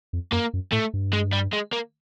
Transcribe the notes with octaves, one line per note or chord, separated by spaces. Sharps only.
F2
F#2 A#3
F#2
A2 A3
G2
G#3
G3
G#3
A#3